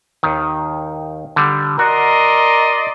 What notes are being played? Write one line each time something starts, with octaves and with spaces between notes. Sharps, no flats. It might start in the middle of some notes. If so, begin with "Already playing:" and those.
D#2 D#3
D3 G3
F#4 A#4 D5 D#5 C6